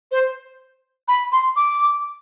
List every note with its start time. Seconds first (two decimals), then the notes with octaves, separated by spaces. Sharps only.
0.11 C5
1.08 B5
1.32 C6
1.56 D6